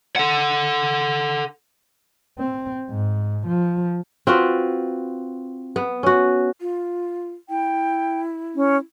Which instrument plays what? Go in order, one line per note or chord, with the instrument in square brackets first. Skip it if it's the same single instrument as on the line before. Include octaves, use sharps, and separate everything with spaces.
[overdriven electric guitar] A4 F#5
[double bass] C4
G#2
F3
[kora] C4 F4 F#4 B4
B3
C#4 F#4
[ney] F4
[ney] E4 [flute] G5
[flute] C#4